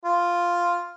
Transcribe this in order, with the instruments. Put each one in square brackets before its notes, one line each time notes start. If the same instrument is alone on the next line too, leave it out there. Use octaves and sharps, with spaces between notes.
[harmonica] F4